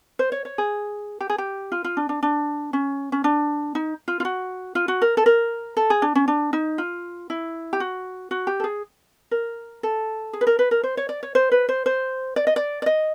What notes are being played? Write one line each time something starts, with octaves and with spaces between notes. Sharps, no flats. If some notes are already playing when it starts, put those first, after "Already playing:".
C5
C#5
C#5
G#4
G4
G#4
G4
F4
F4
D4
D4
D4
C#4
C#4
D4
D#4
F4
F4
F#4
F4
F#4
A#4
A4
A#4
A4
G#4
D4
C#4
D4
D#4
F4
E4
G4
F#4
F#4
G4
A4
G#4
A#4
A4
G#4
B4
A#4
B4
A#4
C5
C#5
D5
C#5
C5
B4
C5
C5
D5
D#5
D5
D5
D#5